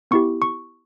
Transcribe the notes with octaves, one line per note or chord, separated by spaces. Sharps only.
B3 E4 G4 C#6
C#6